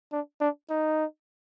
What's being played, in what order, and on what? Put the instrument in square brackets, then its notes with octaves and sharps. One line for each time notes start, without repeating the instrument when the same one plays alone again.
[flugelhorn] D4
D4
D#4